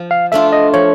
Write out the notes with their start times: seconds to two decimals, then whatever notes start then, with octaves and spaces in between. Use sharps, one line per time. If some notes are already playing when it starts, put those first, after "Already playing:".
Already playing: F3
0.11 F5
0.32 A3 D4 F4 E5
0.53 D#5
0.74 F3 C#5